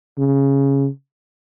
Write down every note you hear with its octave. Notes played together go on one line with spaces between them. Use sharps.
C#3